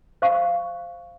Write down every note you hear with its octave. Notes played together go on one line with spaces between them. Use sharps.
C5 F5 C#6